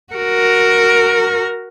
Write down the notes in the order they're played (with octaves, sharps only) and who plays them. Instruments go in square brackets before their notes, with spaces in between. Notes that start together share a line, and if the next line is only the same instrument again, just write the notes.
[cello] F#4 A#4